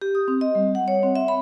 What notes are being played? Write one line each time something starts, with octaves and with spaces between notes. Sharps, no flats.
G4
D#6
C4
D#5
G3
F#5
C#5
C4
E5
B5